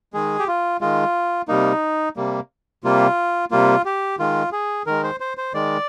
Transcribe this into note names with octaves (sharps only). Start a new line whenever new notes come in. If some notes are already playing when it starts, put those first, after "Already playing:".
D#3 G#3 G#4
G4
F4
D#3 G#3 F4
C3 G3 A#3 D#4
C3 G3 A#3
C3 G3 A#3 F4
C3 G3 A#3 F4
G4
D#3 G#3 F4
G#4
D#3 G#3 A#4
C5
C5
C5
D#3 G#3 D5